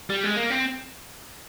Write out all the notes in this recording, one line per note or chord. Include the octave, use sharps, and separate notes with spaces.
G3
G#3
A#3
C4